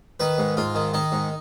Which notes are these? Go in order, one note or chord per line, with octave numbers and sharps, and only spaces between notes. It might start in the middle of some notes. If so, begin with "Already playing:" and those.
D#3 B4
G#2
G#2 F4
D#3
D#3 D#4
G#2